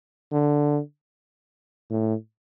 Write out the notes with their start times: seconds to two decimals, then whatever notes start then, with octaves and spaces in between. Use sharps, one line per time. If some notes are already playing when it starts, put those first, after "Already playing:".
0.32 D3
1.90 A2